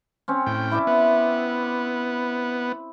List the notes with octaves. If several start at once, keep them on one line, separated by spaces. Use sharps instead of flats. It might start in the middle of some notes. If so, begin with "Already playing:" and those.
C4 C#4
A2 G5
E4 D5 E5
B3